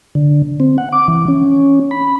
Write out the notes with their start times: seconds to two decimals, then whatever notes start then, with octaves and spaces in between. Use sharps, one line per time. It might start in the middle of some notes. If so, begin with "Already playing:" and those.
0.15 D3
0.60 C4
0.78 F#5
0.92 D6
1.08 E3
1.28 C#4
1.91 B5